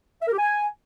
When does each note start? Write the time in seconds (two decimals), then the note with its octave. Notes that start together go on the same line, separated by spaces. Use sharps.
0.22 E5
0.27 A#4
0.33 G4
0.38 G#5